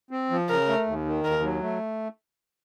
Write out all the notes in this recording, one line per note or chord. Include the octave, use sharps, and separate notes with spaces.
C4
F3
C#3 A#4
A3
D#2
D#3
D#2 A#4
F#3
A3